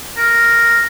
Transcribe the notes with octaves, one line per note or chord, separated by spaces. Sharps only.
A#4